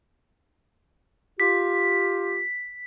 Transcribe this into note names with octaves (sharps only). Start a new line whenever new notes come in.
F4 G4 B6